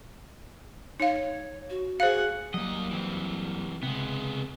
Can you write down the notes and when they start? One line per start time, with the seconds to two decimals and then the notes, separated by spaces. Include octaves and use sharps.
1.00 D#4 C#5 F5
1.70 F#4
2.00 G#4 C5 F5 F#5
2.54 D#2 F#3 G3 A#3 D#5
2.91 E3 C4
3.83 C#2 C3 G#3 B3